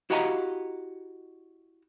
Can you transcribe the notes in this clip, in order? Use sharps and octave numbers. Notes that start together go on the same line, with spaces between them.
E4 F#4 G4 D#5 F5 A#5